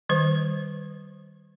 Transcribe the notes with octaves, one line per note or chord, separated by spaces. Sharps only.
D#3 G3 C5